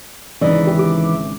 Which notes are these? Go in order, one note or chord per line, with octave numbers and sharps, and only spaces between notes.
G#1 C#3 E3 D#4 D5
G4
D6